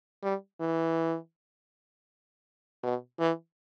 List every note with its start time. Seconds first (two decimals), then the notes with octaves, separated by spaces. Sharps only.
0.23 G3
0.61 E3
2.83 B2
3.20 E3